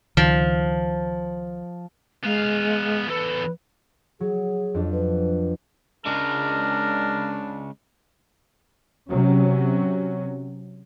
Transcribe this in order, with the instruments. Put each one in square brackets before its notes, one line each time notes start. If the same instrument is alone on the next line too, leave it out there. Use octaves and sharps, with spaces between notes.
[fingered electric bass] C#2 D#3 [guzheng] F3
[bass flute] G#3 [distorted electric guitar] B3 F5
[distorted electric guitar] E2 A4 [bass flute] B4
[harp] F#3 [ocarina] G#4
[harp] F2 D4
[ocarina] B4
[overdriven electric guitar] C#3 G#3 [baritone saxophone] D4 [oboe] A#4
[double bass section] C3 F#3 C#4